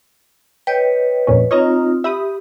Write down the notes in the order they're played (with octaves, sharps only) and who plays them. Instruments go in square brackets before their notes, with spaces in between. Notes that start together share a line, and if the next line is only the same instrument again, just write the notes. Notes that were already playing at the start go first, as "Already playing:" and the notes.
[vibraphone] B4 C#5 D#5 [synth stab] G5
[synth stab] F2 A#2 C#4
[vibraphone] C4 D#4 F4 [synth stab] C#5 D#5 A#5
[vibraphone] G4 [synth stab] E5 B5 D#6